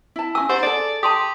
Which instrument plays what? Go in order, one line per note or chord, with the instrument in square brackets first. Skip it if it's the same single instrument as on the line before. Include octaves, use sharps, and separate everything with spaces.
[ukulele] E4 A5
[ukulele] C#4 F#4 G#5 [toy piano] E6
[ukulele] D#4 D5 F#5 [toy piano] G4 [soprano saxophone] C5
[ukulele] G#4 A4 [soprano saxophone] D5
[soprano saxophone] G4 [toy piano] A5 C6 D#6